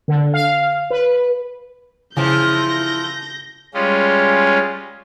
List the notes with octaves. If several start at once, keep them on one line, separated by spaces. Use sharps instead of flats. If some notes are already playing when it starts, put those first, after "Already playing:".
D3
F5
B4
C#3 E3 F3 E4 G6 A#6
G3 G#3 C#4 F4